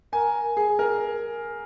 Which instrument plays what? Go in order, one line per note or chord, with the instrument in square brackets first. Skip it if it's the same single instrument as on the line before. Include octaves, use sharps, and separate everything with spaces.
[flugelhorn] A#4 [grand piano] G#5
[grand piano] G#4
A#4